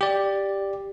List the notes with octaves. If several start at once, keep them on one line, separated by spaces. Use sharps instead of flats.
G4 D5